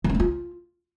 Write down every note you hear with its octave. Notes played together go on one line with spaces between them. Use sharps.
D#3
C#4
A3
F4